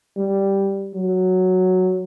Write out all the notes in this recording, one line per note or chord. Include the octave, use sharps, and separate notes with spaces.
G3
F#3